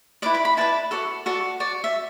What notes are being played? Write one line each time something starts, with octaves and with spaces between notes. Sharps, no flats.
E4 B4 D5 D6
B5
B5
E4 B4 D5 A5
F#4 A4 D5
F#4 A4 D5
F#4 D5
E5